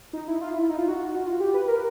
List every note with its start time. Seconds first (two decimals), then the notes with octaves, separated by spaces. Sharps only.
0.13 D#4
0.28 E4
0.41 F4
0.55 E4
0.69 D#4
0.78 F4
0.88 F#4
1.26 F4
1.40 G4
1.54 B4
1.68 A#4